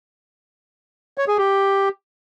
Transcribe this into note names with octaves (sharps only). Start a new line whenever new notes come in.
C#5
G#4
G4